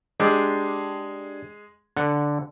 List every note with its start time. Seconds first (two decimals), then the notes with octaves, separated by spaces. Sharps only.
0.20 G#3 D4 G4 G#4
1.96 D3 F#5